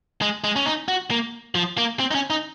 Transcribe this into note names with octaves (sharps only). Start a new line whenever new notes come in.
G#3
G#3
C#4
D#4
F#4
A#3
F3
A#3
C4
D#4
C#4
D#4